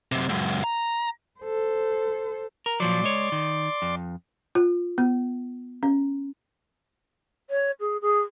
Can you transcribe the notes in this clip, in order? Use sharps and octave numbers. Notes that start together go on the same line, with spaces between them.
F#2 C3
C#2 F#2
A#5
A4 C5
A#4
A#2 F3 F#3 D5 C6 D6
G#3 C#5
D#3
F2
F4
B3
C#4
C#5
G#4
G#4